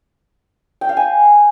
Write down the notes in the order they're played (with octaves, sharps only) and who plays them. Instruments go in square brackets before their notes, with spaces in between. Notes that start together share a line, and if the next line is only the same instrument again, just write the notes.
[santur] G5
F5
G#5